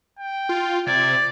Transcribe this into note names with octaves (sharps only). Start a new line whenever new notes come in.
G5
F4
C3 D5 G#6